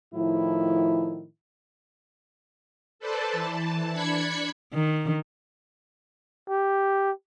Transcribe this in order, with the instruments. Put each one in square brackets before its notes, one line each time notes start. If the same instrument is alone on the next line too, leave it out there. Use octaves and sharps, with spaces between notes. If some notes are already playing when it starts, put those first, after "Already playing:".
[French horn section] A2 D#3 F3 E4
[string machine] A4 B4 C5 D5 A5
E3 A5
D4 B5 G#6 B6 C#7
[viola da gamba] D#3
[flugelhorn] G4